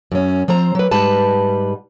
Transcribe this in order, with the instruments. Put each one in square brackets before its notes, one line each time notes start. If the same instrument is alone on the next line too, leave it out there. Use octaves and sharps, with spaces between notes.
[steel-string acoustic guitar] F#2 C#4
F3 C4 C5 A#5
F#3 B4
G#2 G3 B4 A5